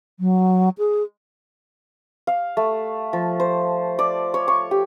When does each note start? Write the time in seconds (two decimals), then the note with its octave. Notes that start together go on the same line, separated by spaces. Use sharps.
0.20 F#3
0.78 G#4
2.27 F5
2.57 A3
3.13 F3
3.40 C5
3.99 D5
4.34 C#5
4.48 C#6
4.71 G4